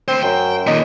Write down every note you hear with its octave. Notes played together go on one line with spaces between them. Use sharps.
D2 C4 C5
F#2 G5
D#2 A#2 D#4